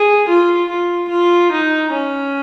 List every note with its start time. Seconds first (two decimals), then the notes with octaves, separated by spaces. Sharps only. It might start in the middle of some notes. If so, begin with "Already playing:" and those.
Already playing: G#4
0.28 F4
0.69 F4
1.10 F4
1.52 D#4
1.92 C#4